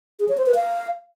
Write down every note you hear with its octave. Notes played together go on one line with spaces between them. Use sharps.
G#4
C#5
C5
B4
F5